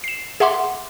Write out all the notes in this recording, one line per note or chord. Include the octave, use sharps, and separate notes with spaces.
C7 E7
G#4 E5 F#5 C6 D6